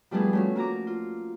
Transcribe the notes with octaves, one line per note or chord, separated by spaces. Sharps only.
F3 G3 A3 B3 D4 G#4
A3 C#4 F#4
A#3 F#4 A#5 D6
F4